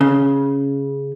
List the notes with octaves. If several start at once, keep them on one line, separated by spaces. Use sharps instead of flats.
C#3